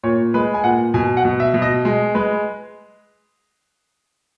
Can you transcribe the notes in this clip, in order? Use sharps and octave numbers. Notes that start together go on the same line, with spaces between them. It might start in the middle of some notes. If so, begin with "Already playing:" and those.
A#2 C#5
G#3 B4
G#5
A#2 F#5
B2 G#5
F#5
B2
E5
B2
D#5
G#3
G#3 B4